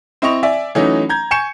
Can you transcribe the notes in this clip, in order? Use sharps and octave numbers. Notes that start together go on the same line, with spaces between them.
C4 E4 D#5 C#6 F7
D5 E5 G#5
E3 F#3 A3 C#4 D#4
A#5 G6 G#6
G#5 C#6 G6 C#7 E7